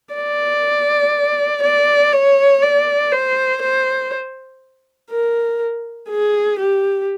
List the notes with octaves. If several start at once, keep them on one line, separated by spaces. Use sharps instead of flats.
D5
D5
C#5
D5
C5
C5
A#4
G#4
G4